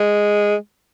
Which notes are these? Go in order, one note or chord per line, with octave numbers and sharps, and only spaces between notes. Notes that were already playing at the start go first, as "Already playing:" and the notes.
Already playing: G#3